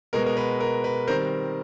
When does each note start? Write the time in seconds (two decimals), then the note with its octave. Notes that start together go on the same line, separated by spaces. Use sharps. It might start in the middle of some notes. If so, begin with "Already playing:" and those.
0.13 B2 G#3 B3 A#4
0.26 A#4
0.37 B4
0.60 A#4
0.84 B4
1.07 D#3 G3 C4 A#4 C5